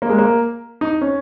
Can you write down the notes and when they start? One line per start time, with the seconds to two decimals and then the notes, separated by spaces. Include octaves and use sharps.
0.02 A#3
0.10 G#3
0.18 A#3
0.81 D#4
1.01 C#4